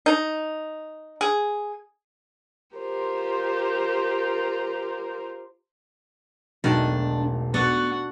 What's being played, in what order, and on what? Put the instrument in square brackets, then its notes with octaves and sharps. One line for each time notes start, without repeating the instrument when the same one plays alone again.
[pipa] D#4
G#4
[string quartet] F4 G4 A#4 C5
[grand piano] E1 B1 [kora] B2 D#3 A3 [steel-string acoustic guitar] D4
[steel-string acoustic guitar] B3 [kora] D4 A4 [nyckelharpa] F#4 F#5